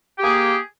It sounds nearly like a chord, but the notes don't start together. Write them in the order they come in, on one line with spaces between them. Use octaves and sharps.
G4 G#4 A#3